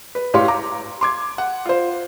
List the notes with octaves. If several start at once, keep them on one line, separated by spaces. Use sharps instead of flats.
B4
A2 G4 C#5 F5 C6
A#5 D6
C6 D6 G#6
F#5
F4 C5